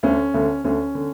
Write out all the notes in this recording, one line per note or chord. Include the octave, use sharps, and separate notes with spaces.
D2 D3 C#4
D2 D3
D2 D3 C#4
D3